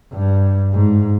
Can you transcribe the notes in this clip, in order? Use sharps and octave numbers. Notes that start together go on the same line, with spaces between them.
G2
G#2